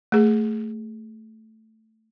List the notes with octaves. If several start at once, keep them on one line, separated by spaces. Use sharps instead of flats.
A3 G#4